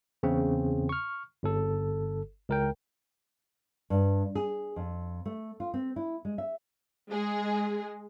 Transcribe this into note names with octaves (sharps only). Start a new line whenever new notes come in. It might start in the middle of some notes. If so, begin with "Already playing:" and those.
E2 C#3 C4
C#6 F6
G1 A4
C#2 A#4 G5
G2
G#4
F2
A3
F4
C4
E4
G#3
E5
G#3 G#4